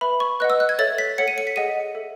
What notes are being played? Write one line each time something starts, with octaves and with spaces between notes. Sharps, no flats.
B4 E5 B5
C#6
B4 D#5 F#5 F#6
E6
F#6
G#6
A4 C#5 E5 A6
B6
A4 C#5 F#5 C#7
D#7
C#7
B6
G#4 D#5 F#5 D#7
A4 E5